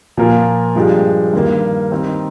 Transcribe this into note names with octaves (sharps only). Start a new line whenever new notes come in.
A#2 F3 A#3 F4 A#4
G2 F3 G#3 D4 G4
G2 D#3 A#3
D#3 G3 C4 D#4 G4